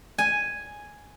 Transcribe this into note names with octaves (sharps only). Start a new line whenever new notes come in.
G#5